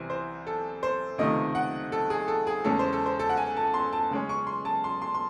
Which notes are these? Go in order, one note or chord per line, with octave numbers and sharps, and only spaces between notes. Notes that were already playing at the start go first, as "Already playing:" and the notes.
Already playing: C2 C3 E3 C4 G#5
C5
A4
C5
C#2 C3 D#3 A3 D#5
F#5
A4
G#4
A4
G#4
E2 C#3 G#3 C#4 A4
C5
A4
C5
A4
F#5
G#5
A5
C6
A5
C#3 G#3 C#4
C#6
C6
A5
C6
C6
C6